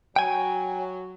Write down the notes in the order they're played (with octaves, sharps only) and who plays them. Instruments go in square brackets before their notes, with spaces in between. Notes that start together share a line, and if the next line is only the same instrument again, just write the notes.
[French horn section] F#3 [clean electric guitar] G5 G#5